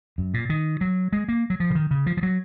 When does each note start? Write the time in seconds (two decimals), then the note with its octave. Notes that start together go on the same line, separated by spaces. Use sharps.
0.18 F#2
0.34 A#2
0.50 D#3
0.81 F#3
1.13 G#3
1.29 A#3
1.50 F#3
1.60 F3
1.70 C#3
1.75 D#3
1.91 C#3
2.06 F3
2.17 F3
2.23 F#3